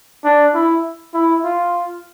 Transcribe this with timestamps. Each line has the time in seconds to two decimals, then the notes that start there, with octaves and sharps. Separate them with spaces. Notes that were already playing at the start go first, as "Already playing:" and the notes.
0.24 D4
0.55 E4
1.14 E4
1.44 F4